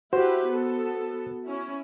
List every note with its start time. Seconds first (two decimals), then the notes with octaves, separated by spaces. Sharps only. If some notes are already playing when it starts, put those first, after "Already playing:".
0.13 E4 F#4 G4 B4 C5
0.48 B3 A4
1.46 C#4 E4